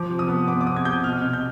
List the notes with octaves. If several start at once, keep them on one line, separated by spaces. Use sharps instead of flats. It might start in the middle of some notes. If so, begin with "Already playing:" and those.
Already playing: F3 D6
C3
D#6
B3
B3 D6
D6
C3 D#6
G#6
C3 G6
B2 F6
B2
G6